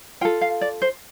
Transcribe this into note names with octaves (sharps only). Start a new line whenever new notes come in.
F4 A4 G5
F5
D5
C5